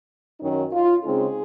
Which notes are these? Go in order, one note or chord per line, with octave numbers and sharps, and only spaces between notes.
F#2 D#3 F#3 C#4 D#4
F4
C#3 G#3 C4 D#4 G#4